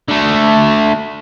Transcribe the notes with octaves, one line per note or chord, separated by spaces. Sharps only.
D3 A3